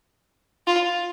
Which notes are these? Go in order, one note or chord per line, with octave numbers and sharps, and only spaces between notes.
F4